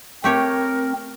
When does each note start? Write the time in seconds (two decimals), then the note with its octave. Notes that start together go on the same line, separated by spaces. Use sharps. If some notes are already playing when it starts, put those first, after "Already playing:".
0.24 A3 C4 G4 A#4 C#5